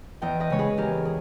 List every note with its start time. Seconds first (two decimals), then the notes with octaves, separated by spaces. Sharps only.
0.22 E2 D#5 G5
0.40 B4 D#5
0.50 C#3 G#3 C#5
0.59 G#4 B4
0.77 E2 G4 A#4
1.05 G#4